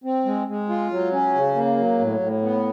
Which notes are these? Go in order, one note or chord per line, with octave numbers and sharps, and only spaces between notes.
C4
G#3
G#3
F4
F#3
C#4
C#3
A#3
F#3
A2
A2
B3